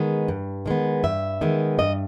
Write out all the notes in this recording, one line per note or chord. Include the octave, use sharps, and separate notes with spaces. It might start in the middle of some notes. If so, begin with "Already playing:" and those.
Already playing: D#3 G#3 B3
G2
D#3 G#3 B3
G2 E5
D#3 G#3 B3
G2 D#5